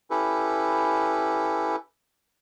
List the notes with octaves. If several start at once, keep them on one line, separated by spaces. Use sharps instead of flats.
C#4 E4 G4 A4 B4